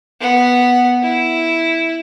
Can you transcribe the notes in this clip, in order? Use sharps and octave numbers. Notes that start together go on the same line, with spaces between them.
B3 F#5
E4